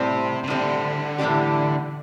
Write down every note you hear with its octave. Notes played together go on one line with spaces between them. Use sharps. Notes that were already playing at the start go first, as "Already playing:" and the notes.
Already playing: A2 C3 G3 C4
C3
A2 D3 G3 C4
A2 E3 G3 D4 G4